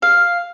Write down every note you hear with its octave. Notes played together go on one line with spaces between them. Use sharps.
F5